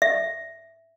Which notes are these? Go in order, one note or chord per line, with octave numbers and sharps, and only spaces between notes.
E5